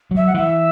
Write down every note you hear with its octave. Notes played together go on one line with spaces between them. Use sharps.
F#3
E5
F#5
E3 E5